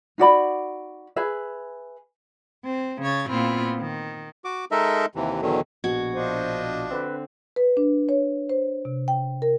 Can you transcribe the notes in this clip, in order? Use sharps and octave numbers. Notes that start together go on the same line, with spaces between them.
D#4 F#4 D5 B5
G#4 B4 E5
C4
C#3 C#5 G#6 A6
A#2 B3 C4 E4 F4
D#3
F#4 D6
G#3 D#4 A4 A#4 D#5 E5
D#2 C3 E3
E2 B2 D3 D#3 F#3
A#1 B2 F#4 G#6
F3 D4 C5 D#5
D3 C4 B4
B4
D4
C#5
C5
C3
G5
A#4